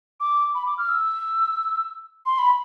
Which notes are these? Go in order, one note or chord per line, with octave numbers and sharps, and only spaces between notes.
D6
B5
D6
F6
E6
C6
B5